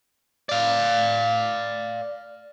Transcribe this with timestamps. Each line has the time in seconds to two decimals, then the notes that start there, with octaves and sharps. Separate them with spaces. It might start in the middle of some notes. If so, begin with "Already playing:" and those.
0.49 D5 F5